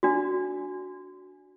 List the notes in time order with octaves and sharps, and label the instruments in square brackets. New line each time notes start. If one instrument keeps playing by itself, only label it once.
[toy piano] D4 F#4